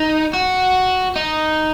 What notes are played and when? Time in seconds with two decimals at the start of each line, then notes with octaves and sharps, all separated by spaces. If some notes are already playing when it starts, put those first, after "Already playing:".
Already playing: D#4
0.33 F#4
1.16 D#4